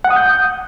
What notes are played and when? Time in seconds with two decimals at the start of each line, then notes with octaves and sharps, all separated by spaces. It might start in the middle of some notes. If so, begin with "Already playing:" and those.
0.05 F#5
0.10 D#6
0.16 G6